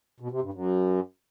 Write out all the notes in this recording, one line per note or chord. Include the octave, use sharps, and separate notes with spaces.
B2
C3
G2
F#2